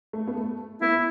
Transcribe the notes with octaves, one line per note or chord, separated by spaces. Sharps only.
A3
B3
A3
B3 E4